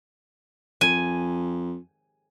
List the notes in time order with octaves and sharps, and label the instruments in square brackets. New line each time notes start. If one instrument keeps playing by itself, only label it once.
[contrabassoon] F2 [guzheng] G#5